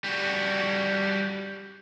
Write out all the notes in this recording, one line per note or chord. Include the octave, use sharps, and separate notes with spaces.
G3 F#4